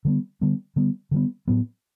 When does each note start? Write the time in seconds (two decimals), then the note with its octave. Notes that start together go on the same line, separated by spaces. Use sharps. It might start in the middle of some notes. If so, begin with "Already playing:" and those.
0.05 D3 G3 B3
0.41 D3 G3 B3
0.76 D3 G3 B3
1.11 D3 G3 B3
1.47 A2 F#3 B3